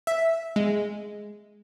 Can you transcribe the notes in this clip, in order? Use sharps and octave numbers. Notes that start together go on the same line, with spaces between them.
E5
G#3